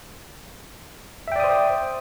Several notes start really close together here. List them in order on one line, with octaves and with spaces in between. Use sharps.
E5 G5 D5 D#6 C5